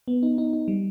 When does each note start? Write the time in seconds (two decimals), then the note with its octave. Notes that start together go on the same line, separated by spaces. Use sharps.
0.08 B3
0.23 D#4
0.38 D#4
0.53 D#4
0.68 G3